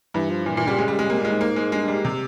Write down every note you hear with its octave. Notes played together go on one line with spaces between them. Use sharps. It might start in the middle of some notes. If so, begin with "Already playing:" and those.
G2 E3
F3
A#2 E3
A#2 E3
C#3 G3
C#3 G#3
G3
G#3
C3 A#3
A#2 G#3
G#2
A#3
G#3
G2 G#3
G2
G3
G#2
C3